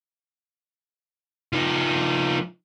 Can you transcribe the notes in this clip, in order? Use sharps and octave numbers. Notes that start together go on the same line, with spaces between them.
F3 D#4